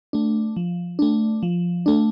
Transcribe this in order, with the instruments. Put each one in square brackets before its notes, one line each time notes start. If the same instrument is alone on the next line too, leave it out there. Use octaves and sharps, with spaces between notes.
[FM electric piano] A3 D4
F3
A3 D4
F3
A3 D4